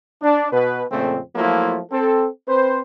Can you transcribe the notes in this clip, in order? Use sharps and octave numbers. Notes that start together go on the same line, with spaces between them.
D4
B2 B4
F2 A#2 C#3 A3 C4
F3 F#3 A3 A#3 E4 F4
C4 A4
C4 B4 C5